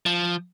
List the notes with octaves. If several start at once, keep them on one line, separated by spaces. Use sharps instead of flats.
F3